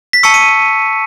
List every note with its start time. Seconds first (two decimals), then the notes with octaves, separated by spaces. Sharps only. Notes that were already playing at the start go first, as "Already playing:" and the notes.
0.13 B6
0.23 A5 C#6 E6 C#7
0.34 D#7